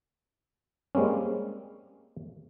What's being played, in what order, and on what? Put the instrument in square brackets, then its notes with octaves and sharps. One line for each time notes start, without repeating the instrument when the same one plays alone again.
[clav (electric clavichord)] G3 G#3 A#3 C4 C#4